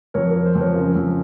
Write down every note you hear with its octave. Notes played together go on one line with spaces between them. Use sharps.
F2 A#4 C#5
F3 A#4
C5
F2
A#4 C#5
C#3
F2